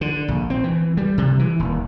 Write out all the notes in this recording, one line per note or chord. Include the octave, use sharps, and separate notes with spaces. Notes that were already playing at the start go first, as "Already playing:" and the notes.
D3
A#1
C4
E3
G3
C3
E3
D#1